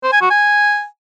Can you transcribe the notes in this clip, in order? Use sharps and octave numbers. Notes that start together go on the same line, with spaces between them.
C5
G#5
F#4
G#5